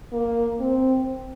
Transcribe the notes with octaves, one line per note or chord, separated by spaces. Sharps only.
A#3
C4